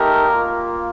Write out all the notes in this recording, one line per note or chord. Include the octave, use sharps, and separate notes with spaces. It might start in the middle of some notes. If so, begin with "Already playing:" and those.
Already playing: A3 D#4 G4 A#4
A#3 F4